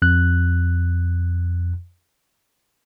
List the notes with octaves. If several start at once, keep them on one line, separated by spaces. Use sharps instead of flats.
F2 F#6